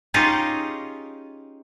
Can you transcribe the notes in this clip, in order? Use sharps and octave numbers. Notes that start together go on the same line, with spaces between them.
C#4 D#4 F4 G4 G#4